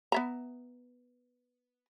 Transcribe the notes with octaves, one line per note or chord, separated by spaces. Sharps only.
B3 E5 A#5